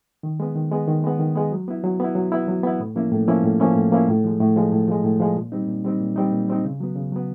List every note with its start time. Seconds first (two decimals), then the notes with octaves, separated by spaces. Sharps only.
0.23 D#3
0.40 G#3 B3
0.56 D#3
0.72 G#3 B3
0.87 D#3
1.04 G#3 B3
1.20 D#3
1.36 G#3 B3
1.52 F#3
1.68 B3 E4
1.84 F#3
2.00 B3 E4
2.15 F#3
2.32 B3 E4
2.48 F#3
2.63 B3 E4
2.80 A2
2.96 F3 A#3 C#4 E4
3.12 A2
3.28 F3 A#3 C#4 E4
3.44 A2
3.60 F3 A#3 C#4 E4
3.76 A2
3.92 F3 A#3 C#4 E4
4.08 A2
4.24 F3 G#3
4.40 A2
4.56 F3 G#3
4.72 A2
4.88 F3 G#3
5.04 A2
5.20 F3 G#3
5.36 A#2
5.52 G3 C4 D#4
5.68 A#2
5.84 G3 C4 D#4
6.00 A#2
6.16 G3 C4 D#4
6.32 A#2
6.48 G3 C4 D#4
6.64 C#3
6.80 F#3 B3
6.96 C#3
7.12 F#3 B3